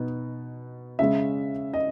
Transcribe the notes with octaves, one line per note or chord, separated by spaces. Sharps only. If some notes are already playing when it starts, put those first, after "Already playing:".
Already playing: B2 B3 D#4
C#3 G#3 C#4 E5
D#5